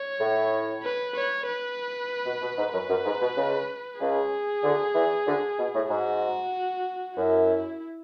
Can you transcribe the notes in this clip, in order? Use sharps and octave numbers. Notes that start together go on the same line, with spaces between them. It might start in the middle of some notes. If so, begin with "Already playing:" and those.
Already playing: C#5
A2
B4
C#5
B4
B2
B2
G#2
F#2 B4
F#2
G#2
B2
C#2 C#3
C#2 C#3 G#4
D2 D3
E2 E3
D2 D3
B2
A2
G#2 F#4
F#2 E4